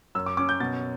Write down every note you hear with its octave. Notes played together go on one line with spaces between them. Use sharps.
F#2 E6
D6
C#4 D6
G6
B2 A6